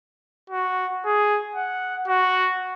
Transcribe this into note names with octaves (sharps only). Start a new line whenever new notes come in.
F#4
G#4
F#5
F#4